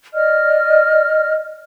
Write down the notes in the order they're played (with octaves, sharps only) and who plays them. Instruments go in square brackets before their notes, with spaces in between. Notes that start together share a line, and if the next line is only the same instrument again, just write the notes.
[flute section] D5 D#5 F6